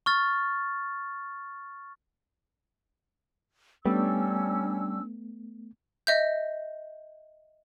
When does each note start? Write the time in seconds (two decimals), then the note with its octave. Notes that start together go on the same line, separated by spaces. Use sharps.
0.06 C#6 F6 A6
3.86 G3 A3 B3 C#4 D4 E6
6.07 D#5 E5 G6